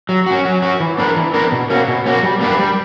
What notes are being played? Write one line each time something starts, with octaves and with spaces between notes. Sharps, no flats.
F#3
C#4 F#4
F#3
C#4 F#4
E3
B3 D4 A#4
E3
B3 D4 A#4
B2
A#3 C#4 F#4
B2
A#3 C#4 F#4
G3
A#3 D4 G4 B4
G3